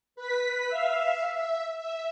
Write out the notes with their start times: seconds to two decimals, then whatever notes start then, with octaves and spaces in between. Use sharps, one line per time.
0.16 B4 B6
0.68 E5 F5
1.33 E5
1.77 E5